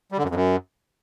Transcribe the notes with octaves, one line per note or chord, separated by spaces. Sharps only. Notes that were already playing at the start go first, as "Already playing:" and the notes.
G3
D3
F#2
F2
F#2